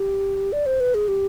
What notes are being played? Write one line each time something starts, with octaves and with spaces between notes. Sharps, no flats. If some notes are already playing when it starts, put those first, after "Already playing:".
Already playing: G4
D5
C5
B4
G#4
G4